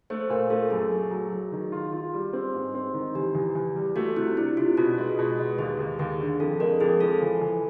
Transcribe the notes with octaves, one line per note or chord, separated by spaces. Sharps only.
A3 C5
A#2 A#4
A3 A4
F#2 G#4
A3
F#3
F#3
D#3
F4
F4
G3
C4
G#2
C4
D#3
E2 G4
E2
E2
G3
A3 F#4
C3 E4
D4 E4
C3 F4
B2 F#4
G#3
B2
G#3
D#2 G#4
D#2
D#2 G#4
D3
F2 A4
G#3 A#4
F2 G#4
F3 A4
E3
E3